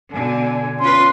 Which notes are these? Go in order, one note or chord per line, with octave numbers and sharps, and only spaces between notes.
B2 D3 G#5
C#4 F4 B4 C6